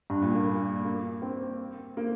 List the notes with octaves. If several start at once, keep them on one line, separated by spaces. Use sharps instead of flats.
G2
A#2
A#3
A#3
C4
A#3